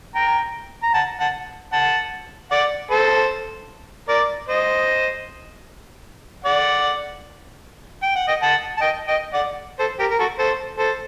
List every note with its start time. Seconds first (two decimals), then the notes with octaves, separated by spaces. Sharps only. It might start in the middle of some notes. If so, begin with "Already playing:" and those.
0.15 G5 A#5
0.83 A#5
0.94 F#5 A5
1.20 F#5 A5
1.73 F#5 A5
2.51 D5 F#5
2.91 A4 C5
4.08 A#4 D5
4.49 C5 D#5
6.45 D5 F#5
8.03 G5
8.16 F#5
8.28 D#5 G5
8.42 F#5 A5
8.77 A5
8.81 D#5 G5
9.07 D#5 G5
9.33 D5 F#5
9.79 A4 C5
9.99 G4 A#4
10.11 A#4
10.19 F#4 A4
10.39 A4 C5
10.78 A4 C5